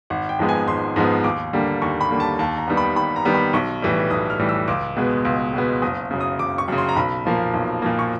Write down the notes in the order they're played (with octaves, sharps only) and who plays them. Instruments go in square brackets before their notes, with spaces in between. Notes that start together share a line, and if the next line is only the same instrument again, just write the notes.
[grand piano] G#1 F#5
G5
G#2 F3 G#3 B3
G#5
G#1 C6
G#2 F3 G#3 B3
D#2 D6
D3 G3 A#3
D#2 C#6
B5
D3 G3 A#3
A5
D#2 A5
A#5
D#3 G3 B3
B5
D#2 B5
A#5
D#3 G3 B3
B5
B1 C#6
A2 E3 G3
B1 D#6
F6
A2 E3 G3
E6
C#2 D6
B2 G#3 B3
C#2
B2 G#3 B3
F#1 D#6
F#2 C#3
D#6
F#1 D6
C#6
F#2 C#3
C6
A#5
B1 B5
A#2 F3 A#3
B1
A#2 F3 A#3
C#6